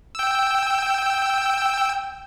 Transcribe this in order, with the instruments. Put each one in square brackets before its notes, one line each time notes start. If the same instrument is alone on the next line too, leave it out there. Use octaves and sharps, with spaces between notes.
[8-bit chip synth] G5 E6